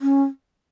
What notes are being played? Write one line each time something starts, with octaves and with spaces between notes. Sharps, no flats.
C#4